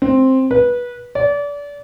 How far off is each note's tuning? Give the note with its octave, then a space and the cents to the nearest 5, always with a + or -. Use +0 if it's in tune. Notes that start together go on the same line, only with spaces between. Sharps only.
C4 +5
B4 -20
D5 -30